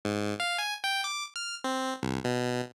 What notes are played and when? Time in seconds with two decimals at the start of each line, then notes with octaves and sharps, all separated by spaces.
0.05 G#2
0.40 F5
0.58 G#5
0.84 G5
1.04 D6
1.36 F6
1.64 C4
2.03 C2
2.24 B2